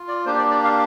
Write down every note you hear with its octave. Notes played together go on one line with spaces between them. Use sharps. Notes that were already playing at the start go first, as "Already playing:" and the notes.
Already playing: F4
D5
A#3 D4 G4 C5
D5
D5
F5